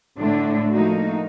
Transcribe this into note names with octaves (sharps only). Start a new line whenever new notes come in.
A2 D3 A3 D4
F3 A3 A#3 D#4 F#4